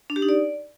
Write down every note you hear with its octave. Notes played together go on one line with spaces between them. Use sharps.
D4
G4
D#4
D5